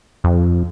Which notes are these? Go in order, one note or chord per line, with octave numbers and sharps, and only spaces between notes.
F2